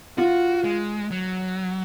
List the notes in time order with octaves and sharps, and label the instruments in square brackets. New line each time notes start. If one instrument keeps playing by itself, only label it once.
[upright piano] F4 [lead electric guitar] F#4
[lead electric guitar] G#3
F#3